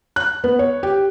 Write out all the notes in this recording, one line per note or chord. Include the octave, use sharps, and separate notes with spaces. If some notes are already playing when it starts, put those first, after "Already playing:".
F#6
B3
C#5
G4